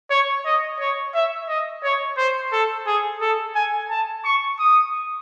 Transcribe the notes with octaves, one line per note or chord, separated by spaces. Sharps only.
C#5
D#5
C#5
E5
D#5
C#5
C5
A4
G#4
A4
G#5
A5
C#6
D#6